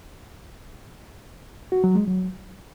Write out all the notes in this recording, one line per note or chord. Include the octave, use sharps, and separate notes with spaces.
F#4
F#3
G#3
F#3